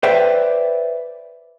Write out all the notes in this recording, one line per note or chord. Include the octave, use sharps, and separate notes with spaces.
B4 C5 D5 E5 G5